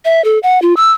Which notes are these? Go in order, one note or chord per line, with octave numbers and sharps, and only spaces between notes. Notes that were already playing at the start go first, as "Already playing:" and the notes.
E5
A4
F#5
F4
E6